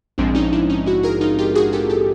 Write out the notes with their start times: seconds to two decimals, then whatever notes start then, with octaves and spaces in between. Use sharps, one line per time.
0.18 A#1 G#2 F3 G#3 C4 D4
0.35 C#4 D#4
0.52 D4 E4
0.70 C#4 D#4
0.86 E4 F#4
1.03 G#4 A#4
1.21 D#4 F4
1.38 F4 G4
1.55 F#4 G#4
1.73 G4 A4
1.90 G4 A4